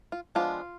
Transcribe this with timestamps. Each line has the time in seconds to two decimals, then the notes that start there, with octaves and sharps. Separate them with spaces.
0.12 F4
0.35 F3 G#3 B3 D4 F4